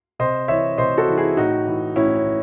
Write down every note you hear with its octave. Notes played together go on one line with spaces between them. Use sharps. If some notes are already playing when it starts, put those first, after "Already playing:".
C3 C5 D#5
E3 C#5 E5
C3 C5 D#5
F#4 A4
E3
E4 G#4
A2 D#4 F#4
E3
A2 C#4 E4
C#4
E3